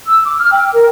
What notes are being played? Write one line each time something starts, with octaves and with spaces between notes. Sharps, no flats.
E6
D6
F6
G5
A#4